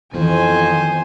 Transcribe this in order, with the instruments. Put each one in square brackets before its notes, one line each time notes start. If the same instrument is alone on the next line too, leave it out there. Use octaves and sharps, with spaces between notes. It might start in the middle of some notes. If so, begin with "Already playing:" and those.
[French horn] F2 [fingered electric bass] D#3 [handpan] E3 B3 [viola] C5 G#5